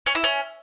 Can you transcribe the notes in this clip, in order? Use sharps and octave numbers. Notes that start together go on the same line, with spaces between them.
C#4
E4
C#4